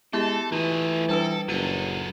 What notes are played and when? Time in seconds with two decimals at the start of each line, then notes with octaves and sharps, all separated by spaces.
0.13 G#3 B3 E4 G4 A4
0.52 E3 A3 F4 D#5
1.09 G3 D4 A4 B4
1.48 F#1 F#3 F4 A4 D#7